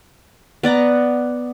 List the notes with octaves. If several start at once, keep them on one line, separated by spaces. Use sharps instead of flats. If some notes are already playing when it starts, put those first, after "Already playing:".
B3 D5 F#5 A#5